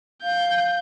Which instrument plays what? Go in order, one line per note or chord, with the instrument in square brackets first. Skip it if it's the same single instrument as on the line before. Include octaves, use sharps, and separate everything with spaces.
[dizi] F5 [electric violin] G6